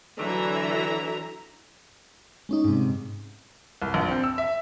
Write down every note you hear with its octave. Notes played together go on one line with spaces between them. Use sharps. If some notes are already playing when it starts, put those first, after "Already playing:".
D3 E3 F#3 E5 A#5
G#3 C#4 D#4
G#2 C3
C2
A#1
C4
E6
E5